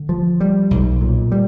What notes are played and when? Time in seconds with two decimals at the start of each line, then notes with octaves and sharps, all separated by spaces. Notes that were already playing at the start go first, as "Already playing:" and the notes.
Already playing: D3
0.09 F3
0.40 G3
0.71 B1
1.01 A#2
1.32 G3